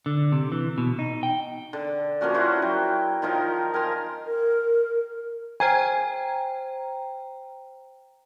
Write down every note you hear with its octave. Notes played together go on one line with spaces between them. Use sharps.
D3
C3
E3
B2
D#4
G5
D3
F3 A#3 C#4 F#4
E4 F#4 B4 C5
F#3 G5
D#3 F3 D#4 A#4
A#4 G#5 A#5 C6
A#4
C5 G5 G#5 A#5